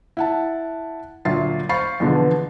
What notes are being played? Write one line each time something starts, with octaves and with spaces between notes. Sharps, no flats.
E4 F#5 A5
D2 A#2 F#3 E5 A6 C7
C5 F5 B5 C#6 A6 C7
E2 B2 D3 F3 B3